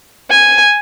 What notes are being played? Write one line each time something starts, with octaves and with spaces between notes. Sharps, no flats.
G#5